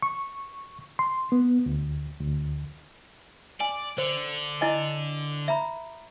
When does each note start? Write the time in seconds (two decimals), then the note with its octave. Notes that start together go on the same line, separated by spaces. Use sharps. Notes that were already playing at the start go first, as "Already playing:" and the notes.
0.02 C#6
0.99 C6
1.32 B3
1.66 D2
2.20 D2
3.60 D5 G#5
3.98 D3 C5
4.61 E4 D#5 G#5
5.48 E5 A#5 B5